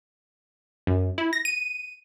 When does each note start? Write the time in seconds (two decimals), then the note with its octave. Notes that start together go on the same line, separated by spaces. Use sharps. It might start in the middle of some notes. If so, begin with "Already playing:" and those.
0.87 F#2
1.18 E4
1.33 A#6
1.45 D#7